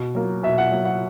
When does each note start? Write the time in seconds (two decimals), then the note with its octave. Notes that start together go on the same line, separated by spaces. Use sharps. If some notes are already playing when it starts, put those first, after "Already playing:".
Already playing: B2
0.15 F#3 A#3
0.43 B2 E5
0.58 F#5
0.71 F#3 A#3
0.85 F#5